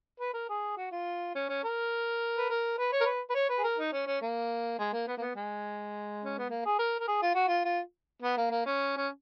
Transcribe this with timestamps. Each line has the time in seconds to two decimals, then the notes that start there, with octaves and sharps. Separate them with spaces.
0.20 B4
0.33 A#4
0.49 G#4
0.76 F#4
0.92 F4
1.35 C#4
1.49 C#4
1.64 A#4
2.38 B4
2.49 A#4
2.78 B4
2.92 C#5
3.01 A#4
3.06 B4
3.30 B4
3.35 C#5
3.49 B4
3.59 G#4
3.64 A#4
3.78 D#4
3.92 C#4
4.07 C#4
4.21 A#3
4.79 G#3
4.93 A#3
5.07 B3
5.17 A#3
5.21 B3
5.36 G#3
6.24 C#4
6.38 B3
6.50 A#3
6.65 G#4
6.79 A#4
7.00 A#4
7.08 G#4
7.22 F4
7.35 F#4
7.48 F4
7.64 F4
8.22 B3
8.37 A#3
8.51 A#3
8.66 C#4
8.97 C#4